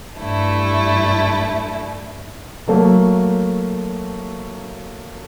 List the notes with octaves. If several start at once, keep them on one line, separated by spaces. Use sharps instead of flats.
G2 A3 E4
F#3 A3 A#3